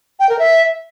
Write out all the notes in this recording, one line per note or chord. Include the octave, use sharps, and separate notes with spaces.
G5
A#4
E5